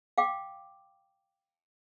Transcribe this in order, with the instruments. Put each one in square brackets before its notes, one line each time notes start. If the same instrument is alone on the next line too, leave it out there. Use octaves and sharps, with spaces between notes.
[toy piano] F5 G5 D6